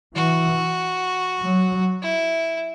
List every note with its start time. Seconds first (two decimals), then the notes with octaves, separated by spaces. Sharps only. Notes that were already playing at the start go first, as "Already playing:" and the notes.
0.15 E3 F#4
1.40 F#3
2.02 E4